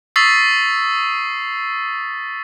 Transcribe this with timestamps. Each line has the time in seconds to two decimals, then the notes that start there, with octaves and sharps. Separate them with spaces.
0.16 C#6 D#6 E6 A6 B6 C7